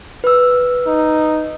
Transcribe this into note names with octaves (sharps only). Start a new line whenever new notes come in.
B4 E6
D#4